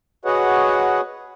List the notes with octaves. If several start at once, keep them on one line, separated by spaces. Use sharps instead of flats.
F#4 G#4 B4 C#5 D#5 F#5